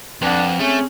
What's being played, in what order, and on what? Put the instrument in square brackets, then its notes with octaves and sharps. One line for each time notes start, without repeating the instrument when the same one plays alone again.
[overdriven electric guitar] F2 [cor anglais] D4 [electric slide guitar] B4 F#5
[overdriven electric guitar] A3 [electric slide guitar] C4 G#4 [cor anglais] C#4